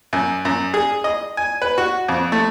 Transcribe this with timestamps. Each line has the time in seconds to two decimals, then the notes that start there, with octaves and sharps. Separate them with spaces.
0.13 F#2
0.45 F#2
0.74 G#4
1.04 D#5
1.37 G#5
1.62 B4
1.78 F#4
2.08 F2
2.32 A3